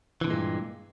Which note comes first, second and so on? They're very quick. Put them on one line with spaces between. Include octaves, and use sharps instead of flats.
E3 D3 A#2 G#3 G2